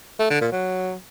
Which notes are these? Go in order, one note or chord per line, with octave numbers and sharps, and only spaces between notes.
A3
D3
A#2
F#3